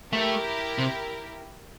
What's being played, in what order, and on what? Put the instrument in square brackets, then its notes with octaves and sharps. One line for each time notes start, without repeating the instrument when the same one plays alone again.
[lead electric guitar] A3 [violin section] E4 G4 A#4
[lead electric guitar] C3